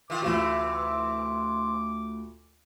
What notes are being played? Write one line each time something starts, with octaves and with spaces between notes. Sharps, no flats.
D#3 F4 D6
D2 C3 E3 F4 F#4